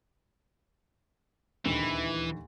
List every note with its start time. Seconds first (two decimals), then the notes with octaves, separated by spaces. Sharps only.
1.65 D#1 D2 D#3 E3